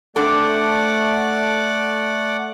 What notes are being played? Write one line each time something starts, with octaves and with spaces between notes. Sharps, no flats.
A3 C4 D4 A4 D5 F#5 D6